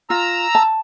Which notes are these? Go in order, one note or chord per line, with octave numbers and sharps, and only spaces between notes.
F4 A#5 E6
A5